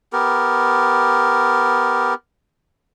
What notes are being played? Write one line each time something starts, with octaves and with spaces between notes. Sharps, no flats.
B3 G4 A#4